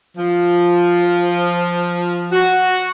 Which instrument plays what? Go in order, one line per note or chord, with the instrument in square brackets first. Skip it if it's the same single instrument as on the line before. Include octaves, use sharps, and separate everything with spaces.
[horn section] F3
F#4